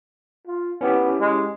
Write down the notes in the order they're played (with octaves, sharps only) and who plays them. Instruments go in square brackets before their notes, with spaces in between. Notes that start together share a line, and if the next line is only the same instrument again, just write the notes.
[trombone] F4
[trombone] B3 [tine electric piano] C#4 E4 G4
[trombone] G#3